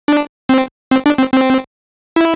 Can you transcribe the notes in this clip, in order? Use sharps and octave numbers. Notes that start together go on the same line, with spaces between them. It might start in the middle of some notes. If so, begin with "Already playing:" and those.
D4
C4
C4
D4
C4
C4
E4